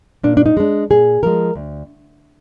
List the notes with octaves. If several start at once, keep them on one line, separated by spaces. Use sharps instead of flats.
A#2 D4
D4
D#4
G#3 D4
A#2 G#4
F3 G#3 A#4
D2